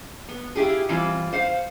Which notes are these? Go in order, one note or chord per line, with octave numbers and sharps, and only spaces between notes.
B3
E4 F4 G4 G#4
E3 G3 C4 F4
C5 F5 F#5